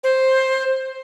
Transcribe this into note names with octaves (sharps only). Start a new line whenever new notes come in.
C5